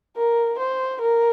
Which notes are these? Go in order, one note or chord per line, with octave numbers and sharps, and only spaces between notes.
A#4
C5
A#4